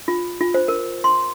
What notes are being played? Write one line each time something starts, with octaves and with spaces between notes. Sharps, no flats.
F4
F4
C5
A#4
C6